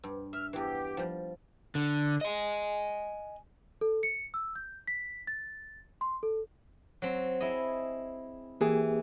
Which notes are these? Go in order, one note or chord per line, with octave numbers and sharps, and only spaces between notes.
G2
E5 F6
E2 E3 G4
F3 G3
D3
D#5 G#5
A4
C#7
E6
G6
B6
A6
C6
A4
F#3 C4
E4 G#4 D#5
E3 A#3 G4 G#4